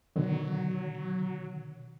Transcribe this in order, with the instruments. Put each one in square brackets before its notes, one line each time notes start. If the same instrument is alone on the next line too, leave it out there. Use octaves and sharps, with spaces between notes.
[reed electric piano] B2 D3 D#3 [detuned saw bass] F#3